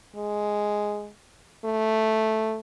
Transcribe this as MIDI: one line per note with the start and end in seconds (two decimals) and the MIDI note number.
0.16 1.09 56
1.65 2.59 57